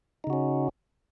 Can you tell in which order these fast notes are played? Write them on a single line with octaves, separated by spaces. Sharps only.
D#4 C#3 F#4 C#4